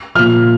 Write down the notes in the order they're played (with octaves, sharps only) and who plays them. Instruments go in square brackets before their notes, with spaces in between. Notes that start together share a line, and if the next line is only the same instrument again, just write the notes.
[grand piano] A#2 F3 F6